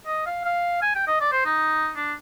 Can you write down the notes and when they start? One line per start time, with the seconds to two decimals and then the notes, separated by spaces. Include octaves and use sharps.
0.06 D#5
0.26 F5
0.45 F5
0.82 G#5
0.95 G5
1.07 D#5
1.21 D5
1.32 C5
1.46 D#4
1.96 D4